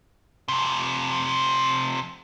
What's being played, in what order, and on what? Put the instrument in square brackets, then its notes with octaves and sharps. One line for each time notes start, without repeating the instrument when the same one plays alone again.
[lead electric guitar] F2 C3